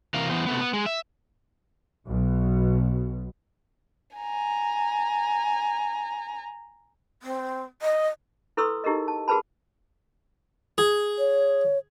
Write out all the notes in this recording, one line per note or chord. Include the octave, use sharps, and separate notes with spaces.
C3 E3 A#4 F5
E3 B3 C5
C3 A3 B3
B3
G#3
E5
B1 B2
G#5 A#5
C4
D#5
E4 A4 B4 C6 C#6 E6
D#4 E4 G4 G#4 A#4 D#5
A5
F#4 G#4 A#4 B4 A5 B5
G#4
C#5